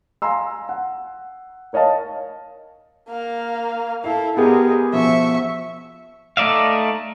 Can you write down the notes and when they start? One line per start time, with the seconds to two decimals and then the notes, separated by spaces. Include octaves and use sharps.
0.22 F5 G#5 A#5 C6 E6
0.69 F#5
1.73 A#4 C#5 D#5 F5 A5
3.09 A#3 F5
4.04 E4 A4 F5
4.37 G#3 B3 G4 G#4 A#4
4.93 B2 F3 E5 C#6
6.37 A3 D#4 D5 E5 F5